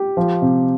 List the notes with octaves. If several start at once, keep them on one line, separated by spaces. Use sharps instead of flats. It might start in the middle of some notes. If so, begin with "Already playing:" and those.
Already playing: G4
F3
C3